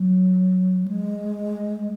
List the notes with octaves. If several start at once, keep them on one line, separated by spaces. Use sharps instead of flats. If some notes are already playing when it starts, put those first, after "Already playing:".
Already playing: F#3
G#3